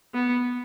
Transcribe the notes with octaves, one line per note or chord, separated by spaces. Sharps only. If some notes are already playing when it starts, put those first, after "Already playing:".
B3